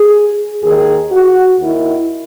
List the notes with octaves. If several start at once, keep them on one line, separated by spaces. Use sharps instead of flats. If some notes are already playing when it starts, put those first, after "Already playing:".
Already playing: G#4
D#2 D#3 G#4
F#4
D#2 D#3 E4